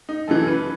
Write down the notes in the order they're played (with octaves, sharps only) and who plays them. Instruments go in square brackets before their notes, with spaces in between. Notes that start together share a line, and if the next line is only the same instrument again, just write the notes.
[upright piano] D#4
F#2 C#3 E3 A4
B4